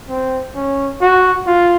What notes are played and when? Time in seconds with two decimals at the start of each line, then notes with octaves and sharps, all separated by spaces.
0.09 C4
0.55 C#4
1.01 F#4
1.47 F4